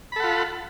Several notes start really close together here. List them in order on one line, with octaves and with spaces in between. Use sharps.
B5 A4 F#5 F4